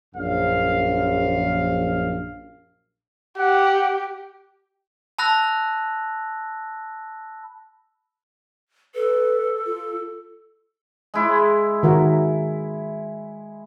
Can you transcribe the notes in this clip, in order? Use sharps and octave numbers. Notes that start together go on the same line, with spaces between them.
A#1 F#2 F5
G4 F#5
A5 B5 E6 F#6 A#6
A4 B4
F4
G#3 E4
D#3 F#4 A#4